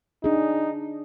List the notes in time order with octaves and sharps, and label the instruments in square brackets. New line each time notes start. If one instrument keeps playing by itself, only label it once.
[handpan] D4 G#4 [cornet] D#4